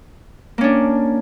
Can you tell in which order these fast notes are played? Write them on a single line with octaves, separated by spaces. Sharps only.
A#3 C#4 D4